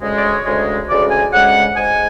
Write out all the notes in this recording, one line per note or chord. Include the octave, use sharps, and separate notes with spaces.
D2 C#3 G#3
D5
C#5
D2 C#3 G#3
D2 C#3 G#3 D5
G#5
D2 C#3 G#3 F#5
G#2 G#3 G#5